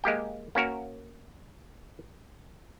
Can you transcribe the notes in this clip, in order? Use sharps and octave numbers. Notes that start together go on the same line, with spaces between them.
G#3 A#3 G4 G5
A#3 C#4 F#4 A#4